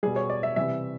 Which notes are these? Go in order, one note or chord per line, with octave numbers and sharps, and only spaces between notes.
B2 G3 G#4
C#5
D5
E5
C3 E3 G3 E5